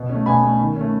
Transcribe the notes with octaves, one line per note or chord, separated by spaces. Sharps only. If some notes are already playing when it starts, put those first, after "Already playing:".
Already playing: B2
A3 C#4
B2 G#5 B5
A3 C#4
D#3
A3 C#4